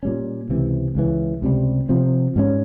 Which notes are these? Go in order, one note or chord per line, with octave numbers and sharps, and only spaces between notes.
A#2 G3 C#4
C#2 C3 E3
C#2 C#3 E3
C#2 C3 G3
C3 F3 C4
G#2 G3 A#3 C#4